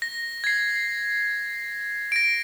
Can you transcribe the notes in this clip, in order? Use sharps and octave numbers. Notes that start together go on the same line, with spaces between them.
A#6
G#6 C7
A#6 D7